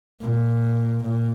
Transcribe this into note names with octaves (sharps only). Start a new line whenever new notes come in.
A#2
A#2